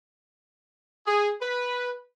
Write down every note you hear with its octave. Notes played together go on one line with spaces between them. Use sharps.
G#4
B4